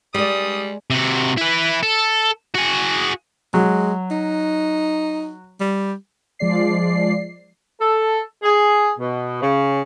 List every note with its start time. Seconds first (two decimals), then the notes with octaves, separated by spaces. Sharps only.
0.14 G3 G#3 D5 D#6
0.90 C3 F#4
1.38 E4 B4
1.83 A4
2.55 F#4 G#4
3.54 F#3 G#3
4.11 D#4
5.60 G3
6.39 F3 G#3 D5 C7
7.79 A4
8.43 G#4
8.98 B2
9.41 C#3